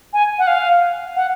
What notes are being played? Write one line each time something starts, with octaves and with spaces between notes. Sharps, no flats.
G#5
F#5
F5
F#5